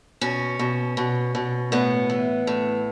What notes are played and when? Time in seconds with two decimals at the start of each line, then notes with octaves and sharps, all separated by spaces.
0.21 B2 C#4
0.59 B2
0.97 B2
1.35 B2
1.72 A2 B3
2.10 E3
2.47 A2